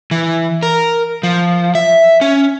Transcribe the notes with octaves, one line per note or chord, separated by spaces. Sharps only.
E3
A#4
F3
E5
C#4